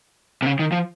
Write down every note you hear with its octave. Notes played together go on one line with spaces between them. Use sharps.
C3
C#3
D#3
F3